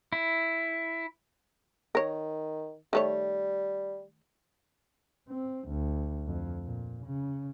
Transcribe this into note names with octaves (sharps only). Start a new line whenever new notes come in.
E4
D#3 A#4 C#5
D#3 G3 A3 C#5
C4
D2
F2
A#2
C#3